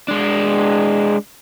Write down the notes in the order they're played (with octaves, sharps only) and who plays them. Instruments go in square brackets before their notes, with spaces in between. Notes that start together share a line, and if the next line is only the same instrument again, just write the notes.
[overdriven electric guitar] G#3 D4